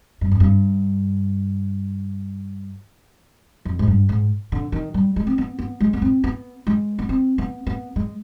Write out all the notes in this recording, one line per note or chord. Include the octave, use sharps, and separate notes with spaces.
G2
F2
G2
F2
G#2
G2
G#2
D3
D#3
G3
G#3
C4
B3
B3
G#3
B3
C4
B3
G#3
B3
C4
B3
B3
G#3